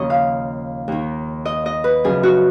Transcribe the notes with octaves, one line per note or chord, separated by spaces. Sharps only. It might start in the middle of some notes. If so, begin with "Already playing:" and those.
Already playing: D#2 C#3 F3 C#5 D#5
F5
D#2 D#3
D#5
D#5
B4
F#2 C#3 F3 G#4
F#4